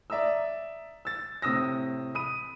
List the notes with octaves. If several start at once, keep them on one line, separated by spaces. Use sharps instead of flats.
D5 E5 A#5 D#6 E6
E6 A6
A2 C3 D#6 E6 A#6
B5 D#6 D#7